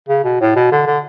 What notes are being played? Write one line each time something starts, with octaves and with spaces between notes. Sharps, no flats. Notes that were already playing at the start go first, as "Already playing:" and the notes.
C#3
B2
A2
B2
D3
D3